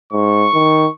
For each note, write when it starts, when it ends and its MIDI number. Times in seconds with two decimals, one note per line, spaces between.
0.13 0.48 44
0.13 0.91 85
0.54 0.87 51